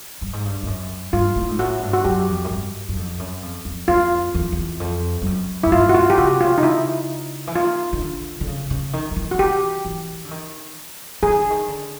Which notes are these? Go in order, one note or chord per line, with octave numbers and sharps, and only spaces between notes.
G2
G#2
G2
F2
F#2
G2 F4
A2
G#2
A2 F#4
G2
F#4
F#2 G4
F2
F#2
G2
F#2
F2
F#2
F2
F2
F2 F4
E2
E2
F2
G2
F#2
F#2 E4
G2 F4
F#4
F4
G4
C#3 F#4
C3
C#3 F4
D#4
E4
E3
D#3 F4
D#3
D3
D3
C#3
C#3
D#3
D#3
E3
D#3 F#4
E3 G4
E3
D3
D#3
E3 G#4
D#3
D3
D#3
D3